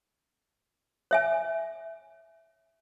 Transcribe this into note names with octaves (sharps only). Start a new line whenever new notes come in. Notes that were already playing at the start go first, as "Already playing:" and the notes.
C#5 E5 G#5